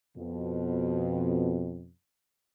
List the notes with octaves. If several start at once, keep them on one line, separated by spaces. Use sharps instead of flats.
F2 B2